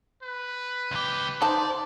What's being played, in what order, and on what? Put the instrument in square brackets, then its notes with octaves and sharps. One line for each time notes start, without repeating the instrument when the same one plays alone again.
[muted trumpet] B4
[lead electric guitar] C#2 G4
[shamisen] D#4 A5 [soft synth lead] C5 [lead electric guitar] D5